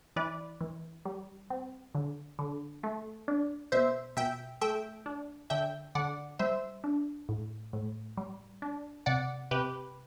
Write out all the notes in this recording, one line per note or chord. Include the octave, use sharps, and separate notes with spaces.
E3 B4 D5
E3
G3
C4
D3
D3
A3
D4
B2 C5 E5
B2 E5 G5
A3 E5 G5
D4
D3 E5 G5
D3 D5 F#5
G3 C5 E5
D4
A2
A2
G3
D4
C3 D5 F#5
C3 G4 B4